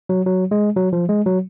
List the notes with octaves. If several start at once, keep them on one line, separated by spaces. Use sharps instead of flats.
F#3
F#3
G#3
F#3
F3
G#3
F#3